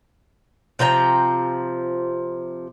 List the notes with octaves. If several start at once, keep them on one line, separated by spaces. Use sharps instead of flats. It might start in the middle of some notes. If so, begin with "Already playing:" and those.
C3 F3 G5 A#5